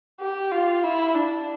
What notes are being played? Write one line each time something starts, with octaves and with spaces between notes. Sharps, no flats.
G4
F4
E4
D4